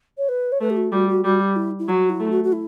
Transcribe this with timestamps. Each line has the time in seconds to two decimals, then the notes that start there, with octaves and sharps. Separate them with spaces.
0.17 C#5
0.28 B4
0.52 C#5
0.60 A3 B4
0.69 G4
0.76 F#4
0.92 G3 F#4
1.09 F#4
1.24 G3 F#4
1.40 G4
1.56 E4
1.79 E4
1.88 F#3 F#4
2.09 E4
2.20 A3
2.31 F#4
2.43 F#4
2.52 E4